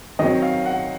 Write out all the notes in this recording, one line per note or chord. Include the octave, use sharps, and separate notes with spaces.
D#3 F#3 C4 D#5
F5
F#5